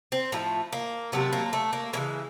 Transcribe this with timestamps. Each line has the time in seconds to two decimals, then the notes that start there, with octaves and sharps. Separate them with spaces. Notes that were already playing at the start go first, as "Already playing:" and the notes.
0.12 C4
0.32 A2 F3 A3 A#3
0.73 A#3
1.12 C3 D#3 F#3 A3 B3
1.33 A#3
1.53 A3
1.73 A#3
1.93 C#3 E3 G#3 A#3